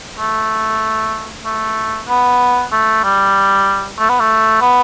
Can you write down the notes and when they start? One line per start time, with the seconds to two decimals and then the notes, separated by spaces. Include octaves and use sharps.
0.19 A3
1.45 A3
2.08 B3
2.72 A3
3.04 G3
3.99 A3
4.09 B3
4.20 A3
4.61 B3